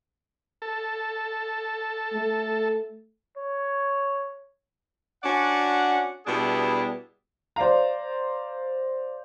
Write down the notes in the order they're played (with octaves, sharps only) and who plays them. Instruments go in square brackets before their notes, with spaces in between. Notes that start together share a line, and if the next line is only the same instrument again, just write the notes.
[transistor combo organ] A4
[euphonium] A3
[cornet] C#5
[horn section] C#4 D4 F#4 D5 F#5
B2 G3 B3 D4 E4 G#4
[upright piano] C5 D5 F5 A#5